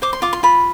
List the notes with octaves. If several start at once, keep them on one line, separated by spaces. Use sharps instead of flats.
C5 D6
C6
F4 D6
C6
F4 B5